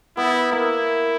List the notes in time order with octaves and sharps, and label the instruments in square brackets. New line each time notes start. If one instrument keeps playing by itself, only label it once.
[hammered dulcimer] B3 [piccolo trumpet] E4
[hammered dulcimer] A#3 [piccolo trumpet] E4